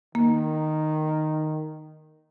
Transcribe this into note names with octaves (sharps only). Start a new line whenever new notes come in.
D#3 A#3